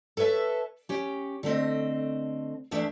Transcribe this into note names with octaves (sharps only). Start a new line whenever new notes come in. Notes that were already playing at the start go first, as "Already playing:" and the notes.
A4 B4 C#5 E5 A5
C#4 G4
D3 A3 C4 D#5
E2 A3 D4 E5